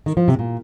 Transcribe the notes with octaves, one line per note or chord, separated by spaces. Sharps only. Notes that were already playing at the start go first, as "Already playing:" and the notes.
D#3
F3
C3
A#2